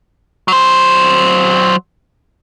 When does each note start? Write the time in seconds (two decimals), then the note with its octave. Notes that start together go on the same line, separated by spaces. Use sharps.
0.48 F#3 C5